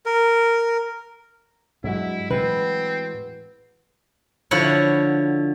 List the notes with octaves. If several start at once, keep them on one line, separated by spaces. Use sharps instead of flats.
A#4
G2 F#3 G#3 E4 F#5
A2 E3 C4 B4
D3 F3 E4 F#4 C#5 F#5